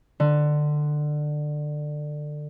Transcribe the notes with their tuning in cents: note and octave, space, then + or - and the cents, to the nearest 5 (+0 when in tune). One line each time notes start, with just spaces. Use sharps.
D3 +20